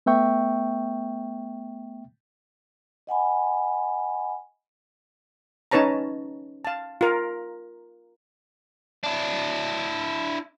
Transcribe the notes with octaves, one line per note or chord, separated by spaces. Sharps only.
A3 B3 E5 G5 C#6
D#5 F#5 G#5 B5
C#4 D#4 B4 C#5 A5 A#5
F5 A5
F4 A#4
D4 E4